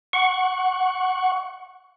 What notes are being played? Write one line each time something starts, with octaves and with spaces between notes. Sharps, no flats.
F#5 C#6